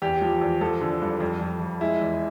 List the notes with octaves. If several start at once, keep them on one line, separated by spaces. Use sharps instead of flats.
E2 G4
F3
E2
F3 A4
D3
G2
F2
F2
F2
G#3 E4
E2